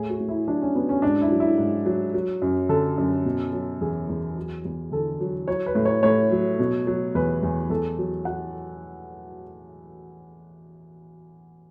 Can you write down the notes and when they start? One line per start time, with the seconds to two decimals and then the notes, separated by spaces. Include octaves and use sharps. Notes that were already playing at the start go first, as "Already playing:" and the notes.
Already playing: A2 G#4
0.09 F#4
0.20 A2
0.29 E4
0.48 F#3 D4
0.62 C#4
0.74 F#3 B3
0.89 C#4
1.02 G#2 D4
1.21 E4
1.31 F#3
1.40 E4
1.58 G#2
1.86 F#3
2.14 F#3
2.42 F#2
2.69 D3 A4
2.98 F#2
3.25 B2
3.53 F#3
3.81 E2 G#4
4.09 E2
4.36 F#3
4.65 E2
4.92 D3 A4
5.21 F#3
5.48 F#3 C#5
5.66 B4
5.75 A2
5.85 C#5
6.03 A2 C#5
6.31 F#3
6.59 B2
6.87 F#3
7.15 E2 B4
7.43 E2
7.70 E2 A4
7.98 F#3
8.25 F#3 F#5